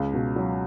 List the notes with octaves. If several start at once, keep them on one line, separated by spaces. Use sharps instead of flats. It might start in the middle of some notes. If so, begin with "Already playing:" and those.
Already playing: C#2 C#3
B2
F#3